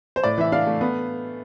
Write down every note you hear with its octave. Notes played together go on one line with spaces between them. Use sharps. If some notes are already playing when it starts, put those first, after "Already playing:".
C5
A2 D5
E3 E5
D4 F5
A3
B3